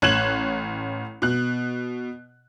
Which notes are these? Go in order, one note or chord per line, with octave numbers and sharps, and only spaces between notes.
A1 C#5 F#6 G#6 E7 F#7
B2 F#6